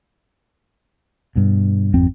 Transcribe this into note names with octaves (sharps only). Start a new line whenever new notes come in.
G2 B2
G#1 F2 C4